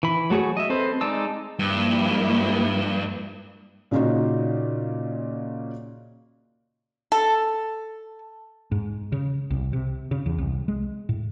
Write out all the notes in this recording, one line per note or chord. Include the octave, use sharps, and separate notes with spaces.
E3 B5
F#3 A3 F#4 G#4 C#5
D#5 E5
C4 A4 B4 C5
G#3 D#4 D5 A5 E6
G2 F3 A#3 E4
A#2 C#3 C#4 D#4 F4 F#4
A4
G#2
C#3
C2
C3
C#3
E2
C2
G#3
A2